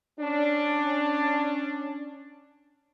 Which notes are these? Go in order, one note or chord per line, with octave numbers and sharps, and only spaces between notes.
C#4 D4